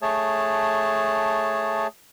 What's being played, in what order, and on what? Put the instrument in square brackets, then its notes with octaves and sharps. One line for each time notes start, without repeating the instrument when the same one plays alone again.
[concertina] A3 G#4 C#5 A5